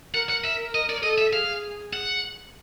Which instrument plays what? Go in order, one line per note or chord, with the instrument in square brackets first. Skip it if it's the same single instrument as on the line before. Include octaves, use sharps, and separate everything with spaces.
[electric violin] A#4 [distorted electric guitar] F#5
[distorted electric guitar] F#5
E5
D#5
D5
[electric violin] A4 [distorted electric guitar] D#5
[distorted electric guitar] E5
[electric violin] G#4 [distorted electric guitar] F5
[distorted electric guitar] F#5